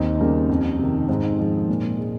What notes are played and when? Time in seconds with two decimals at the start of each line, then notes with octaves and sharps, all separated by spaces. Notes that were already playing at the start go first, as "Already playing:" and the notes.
Already playing: D#2 C4 D#4
0.20 C#3 G3 A#3
0.49 F2
0.78 C3 D#3
1.08 G#2 C4 D#4
1.39 F3 G#3
1.68 A#2
1.98 G#3